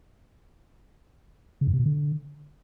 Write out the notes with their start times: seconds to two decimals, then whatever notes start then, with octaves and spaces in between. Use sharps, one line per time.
1.61 C#3
1.67 F#2
1.73 C3
1.79 B2
1.86 D3